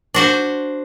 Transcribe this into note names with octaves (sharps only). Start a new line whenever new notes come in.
D4 F#4 C5